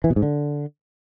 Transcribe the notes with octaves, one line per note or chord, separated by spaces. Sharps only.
E3
B2
G#2
D3